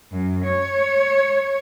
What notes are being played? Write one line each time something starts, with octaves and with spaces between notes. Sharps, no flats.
F#2
C#5